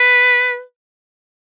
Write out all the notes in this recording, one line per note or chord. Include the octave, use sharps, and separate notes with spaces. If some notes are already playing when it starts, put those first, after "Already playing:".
Already playing: B4